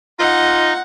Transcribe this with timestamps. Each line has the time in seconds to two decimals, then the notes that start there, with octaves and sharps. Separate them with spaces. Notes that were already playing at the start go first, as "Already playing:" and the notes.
0.19 D#4 F4 D#5 F#5